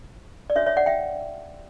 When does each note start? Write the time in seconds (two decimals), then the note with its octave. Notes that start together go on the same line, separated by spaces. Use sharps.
0.50 D5
0.56 D4 F#4 B4 C#5 E5
0.66 C#5 E5
0.77 D5 F#5
0.86 E5 G5